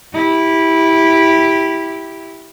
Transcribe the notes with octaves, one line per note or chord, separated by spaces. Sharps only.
E4 G4